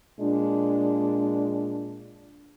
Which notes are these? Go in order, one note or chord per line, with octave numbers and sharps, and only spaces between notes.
A#2 G#3 D4